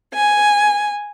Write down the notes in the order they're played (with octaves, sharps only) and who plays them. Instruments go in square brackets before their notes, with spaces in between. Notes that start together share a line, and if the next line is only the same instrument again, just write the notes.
[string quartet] G#5